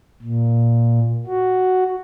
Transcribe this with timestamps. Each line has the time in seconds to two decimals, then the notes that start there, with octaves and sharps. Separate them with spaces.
0.22 A#2
1.27 F#4